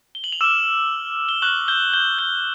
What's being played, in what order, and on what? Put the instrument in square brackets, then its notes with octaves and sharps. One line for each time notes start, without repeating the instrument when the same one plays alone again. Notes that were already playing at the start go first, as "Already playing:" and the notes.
[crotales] G7
F#7
F7
D6 E6 F6 E7
G7
C#6 F6 F#6 F#7
G6 G7
G6 G7
G6 G7